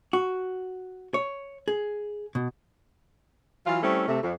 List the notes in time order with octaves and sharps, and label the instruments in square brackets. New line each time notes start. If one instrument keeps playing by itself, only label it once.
[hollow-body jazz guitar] F#4
C#5
G#4
B2
[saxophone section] E3 F#3 F4
G3 A3 C4 C#4 E4
C3 A3
F2